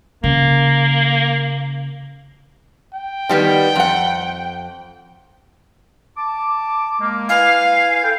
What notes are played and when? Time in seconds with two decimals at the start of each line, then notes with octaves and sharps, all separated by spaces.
0.24 C#3 A#3
2.94 G5
3.29 D#3 G3 B3
3.76 F2 F#5
6.17 A5 D6
7.00 G#3 A#3
7.29 E4 B4 F5 G#5
8.04 A4 G5